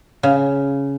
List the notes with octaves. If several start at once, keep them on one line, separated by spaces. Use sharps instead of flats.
C#3